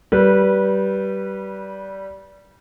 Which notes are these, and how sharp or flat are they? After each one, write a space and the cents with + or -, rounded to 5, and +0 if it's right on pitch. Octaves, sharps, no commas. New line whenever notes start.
G3 -20 B4 -15